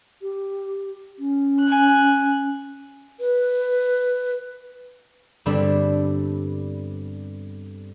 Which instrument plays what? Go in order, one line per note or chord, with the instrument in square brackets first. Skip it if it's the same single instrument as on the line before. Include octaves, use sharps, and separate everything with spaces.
[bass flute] G4
C#4
[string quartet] G#5 F#6
[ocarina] B4
[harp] G2 D3 G3 B3 C4 D4